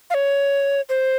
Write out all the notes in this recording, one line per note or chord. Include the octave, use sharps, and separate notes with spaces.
F5
C#5
C5